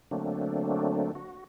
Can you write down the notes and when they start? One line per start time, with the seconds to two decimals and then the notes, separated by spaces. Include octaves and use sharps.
0.11 D3 F#3 A3 A#3 C4 D4
1.15 F#4